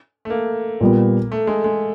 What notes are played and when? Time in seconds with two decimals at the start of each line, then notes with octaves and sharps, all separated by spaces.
0.25 A3
0.30 A#3
0.81 A#2 G3 B3
1.32 A3
1.47 G#3
1.64 G#3